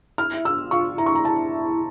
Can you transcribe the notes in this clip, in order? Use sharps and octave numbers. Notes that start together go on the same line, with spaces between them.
E4 F6
F4 E6
F4 C#6
E4 A#5
C#6
A#5
A5